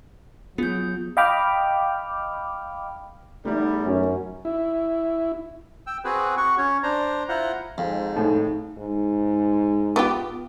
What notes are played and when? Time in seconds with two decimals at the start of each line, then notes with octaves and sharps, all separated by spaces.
0.58 F#3 B3 F4 G#4 G6
1.17 D#5 F5 G5 B5 D6 F6
3.45 E2 G3 A3 D#4
3.86 F#2 C#4
4.45 E4
5.87 G5 E6
6.04 C4 F#4 G#4 B4
6.37 F#4 C#6
6.58 C#4 C#5
6.83 D4 C5 A#5
7.29 E4 F4 C5 F#5 A#5
7.78 F2 G#2
8.16 A2 D#4
8.78 G#2
9.96 B3 F4 G4